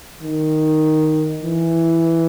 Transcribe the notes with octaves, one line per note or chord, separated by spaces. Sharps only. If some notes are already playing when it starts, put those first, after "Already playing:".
D#3
E3